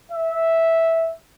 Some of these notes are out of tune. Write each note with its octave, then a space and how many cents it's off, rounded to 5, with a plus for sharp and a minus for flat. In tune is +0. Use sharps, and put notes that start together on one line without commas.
E5 -5